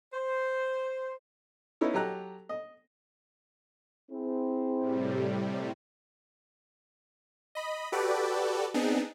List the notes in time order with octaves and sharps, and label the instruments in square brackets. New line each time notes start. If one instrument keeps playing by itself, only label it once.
[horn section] C5
[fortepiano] B3 C#4 D#4 E4
F#3 G4 A4 A#5 F#6
D#5
[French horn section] C4 E4 G#4
[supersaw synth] A2 C3 G3
D#5 B5
F#4 G4 A4 B4 D5
B3 C4 D4 D#4 G#4